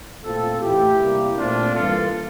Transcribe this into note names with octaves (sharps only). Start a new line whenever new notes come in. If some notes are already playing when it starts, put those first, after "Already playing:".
A#2 A3 C4 F4 A4
A2 E3 A3 E4 G4
C3 G3 A#3
A#2 A3 C4 D4 F4
G2 E3 A#3 F4 A4